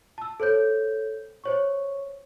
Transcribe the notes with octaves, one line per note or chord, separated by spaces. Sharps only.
A5 E6
A4 C5 C#5 G6
C5 C#5 C#6